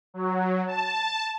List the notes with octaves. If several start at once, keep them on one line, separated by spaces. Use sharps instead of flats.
F#3
A5